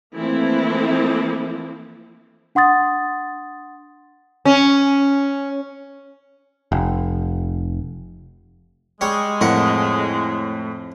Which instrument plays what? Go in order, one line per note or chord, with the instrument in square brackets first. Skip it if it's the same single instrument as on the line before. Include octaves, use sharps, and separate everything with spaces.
[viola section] E3 F3 A3 A#3 C4 E4
[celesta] D4 F#5 C6 D#6 A6
[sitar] C#4
[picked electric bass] F1
[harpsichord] G3 C#5 [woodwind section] G#3
[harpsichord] F2 A#4 F#5 [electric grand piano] A2